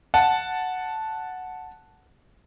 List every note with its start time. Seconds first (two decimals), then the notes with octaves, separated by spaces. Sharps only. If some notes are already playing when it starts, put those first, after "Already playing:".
0.14 F#5 A5